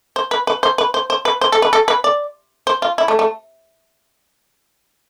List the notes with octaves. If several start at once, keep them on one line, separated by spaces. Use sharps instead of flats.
C5
B4
B4
C5
B4
C5
C5
B4
C5
A4
B4
A4
B4
D5
C5
F4
E4
A3
A3